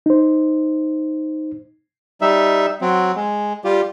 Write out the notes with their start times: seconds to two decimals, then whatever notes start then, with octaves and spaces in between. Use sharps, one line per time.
0.06 D#4 C5
2.21 G3 D#4 E5
2.81 F#3 C4
3.16 G#3
3.64 G3 F4 G4